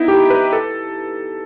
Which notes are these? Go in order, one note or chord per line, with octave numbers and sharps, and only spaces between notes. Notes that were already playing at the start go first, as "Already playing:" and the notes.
Already playing: B3 D#4 E4
G4
B4
A4